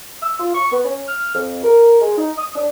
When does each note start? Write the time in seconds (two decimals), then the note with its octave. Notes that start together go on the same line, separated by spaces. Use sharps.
0.22 E6
0.40 F4
0.55 C#6
0.72 B3
0.85 C#4
1.08 F6
1.35 F2
1.64 A#4
2.01 G#3
2.17 D#4
2.38 D#6
2.56 D4